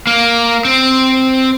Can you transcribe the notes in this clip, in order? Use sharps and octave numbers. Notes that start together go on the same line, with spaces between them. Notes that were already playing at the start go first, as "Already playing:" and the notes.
A#3
C4